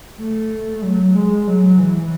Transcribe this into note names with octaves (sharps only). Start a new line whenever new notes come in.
A3
F#3
G#3
F#3
E3